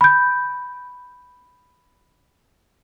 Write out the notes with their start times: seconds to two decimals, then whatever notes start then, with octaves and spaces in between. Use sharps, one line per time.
0.01 B5 G6